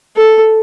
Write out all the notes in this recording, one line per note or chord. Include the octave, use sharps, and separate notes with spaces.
A4